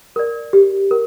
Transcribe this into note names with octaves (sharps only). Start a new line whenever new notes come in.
A#4 D5
G4
A#4